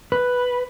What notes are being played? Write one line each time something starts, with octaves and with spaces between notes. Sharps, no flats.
B4